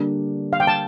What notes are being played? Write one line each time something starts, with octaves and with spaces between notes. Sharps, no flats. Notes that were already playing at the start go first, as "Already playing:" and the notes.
Already playing: D3 G3 A#3 D4
F5
G5
A5